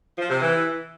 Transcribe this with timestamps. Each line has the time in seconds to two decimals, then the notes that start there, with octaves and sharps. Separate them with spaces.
0.18 F3
0.30 C3
0.42 E3